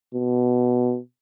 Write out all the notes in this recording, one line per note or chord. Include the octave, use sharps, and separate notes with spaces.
B2